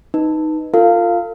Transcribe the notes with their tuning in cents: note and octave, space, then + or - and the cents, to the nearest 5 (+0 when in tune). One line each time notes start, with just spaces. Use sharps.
D#4 +0 B4 +0
F4 +0 A4 +45 F5 -10